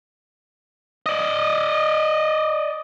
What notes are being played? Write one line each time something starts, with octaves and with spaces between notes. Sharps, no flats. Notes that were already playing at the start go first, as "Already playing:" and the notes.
D5 D#5